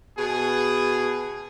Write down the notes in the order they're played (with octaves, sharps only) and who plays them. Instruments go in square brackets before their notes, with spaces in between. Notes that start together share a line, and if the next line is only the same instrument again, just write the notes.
[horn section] B2 G#4